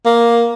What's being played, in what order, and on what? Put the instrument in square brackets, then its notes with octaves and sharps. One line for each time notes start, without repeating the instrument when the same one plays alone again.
[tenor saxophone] A#3